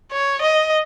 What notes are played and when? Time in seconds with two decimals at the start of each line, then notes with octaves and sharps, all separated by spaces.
0.12 C#5
0.42 D#5